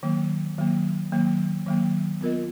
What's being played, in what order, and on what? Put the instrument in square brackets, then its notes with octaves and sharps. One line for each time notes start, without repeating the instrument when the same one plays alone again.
[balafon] D#3 F#3 A#3
D#3 F#3 A#3
D#3 F#3 A#3
D#3 F#3 A#3
B3 F4 A#4 D#5